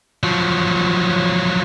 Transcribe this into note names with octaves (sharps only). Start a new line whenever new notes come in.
F3 F#3